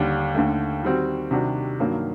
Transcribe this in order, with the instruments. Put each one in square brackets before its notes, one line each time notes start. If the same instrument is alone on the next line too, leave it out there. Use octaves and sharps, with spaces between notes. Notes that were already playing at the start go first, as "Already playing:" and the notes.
Already playing: [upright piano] D#2 D3 G3 D4
D#2 D3 A3
D#3 G3 C4 F#4
C3 D#3 G3 D4 F#4
G2 D#3 F#3 A#3